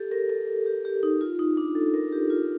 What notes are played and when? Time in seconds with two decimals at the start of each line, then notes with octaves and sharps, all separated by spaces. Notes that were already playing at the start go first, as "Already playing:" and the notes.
Already playing: G4 A4
0.11 A#4
0.30 A4
0.48 A4
0.66 G4
0.85 G4
1.03 D#4
1.21 F4
1.39 D#4
1.57 D4
1.75 A4
1.94 A#4
2.12 G4
2.30 F4